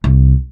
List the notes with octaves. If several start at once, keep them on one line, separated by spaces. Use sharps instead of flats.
C2